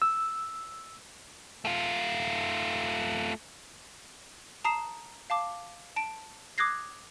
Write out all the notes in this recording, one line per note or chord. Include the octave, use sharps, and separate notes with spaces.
E6
A3 F4
A5 A#5 D#6 C7 E7
F5 A5 D6
A5 D7
D6 D#6 F#6 G#6 A#6 C7